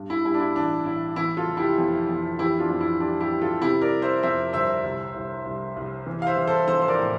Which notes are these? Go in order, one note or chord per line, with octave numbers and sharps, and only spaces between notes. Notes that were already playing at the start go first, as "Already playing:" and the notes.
Already playing: G2
E4
G3 E4
D4
E4
A1 D4
A1 E4
E3 E4
F4 A4
F1
E4 G4
F2
F2
E3 E4 G4
D4 F4
F2
E4
G3 D4
E4 G4
G3
F4 A4
C3 E4 G4
A#4 D5
G3
C5 E5
F2 C5 E5
G1 C5 E5
C2
C2
C2
C2
E3
F5
C5 E5
E3
A4 C5
A#1 A4 C5
C5
A#4 D5
A2